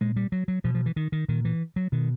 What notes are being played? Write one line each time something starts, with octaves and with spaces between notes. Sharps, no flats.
A#2 G#3
G3
F#3
F#3
B2 F3
F3
E3
D#3
D#3
A#2 D#3
E3
F#3
B2 D#3